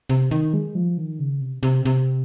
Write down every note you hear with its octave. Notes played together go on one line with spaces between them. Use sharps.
C3
D#3
G#3
F3
D#3
C#3
C3
C3
C3